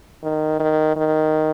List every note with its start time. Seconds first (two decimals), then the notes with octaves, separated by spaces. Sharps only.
0.23 D#3
0.60 D#3
0.96 D#3